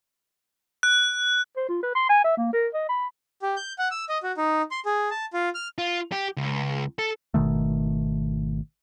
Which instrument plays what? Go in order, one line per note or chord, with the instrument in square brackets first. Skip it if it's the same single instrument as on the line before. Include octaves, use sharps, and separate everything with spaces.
[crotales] F#6
[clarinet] C5
F4
B4
C6
G#5
E5
A#3
A#4
D#5
B5
[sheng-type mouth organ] G4
G6
F#5
E6
D#5
F#4
D#4
C6
G#4
A5
F4
F6
[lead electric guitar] F4
G4
C#2
A4
[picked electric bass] G#1 B2 D#3 A3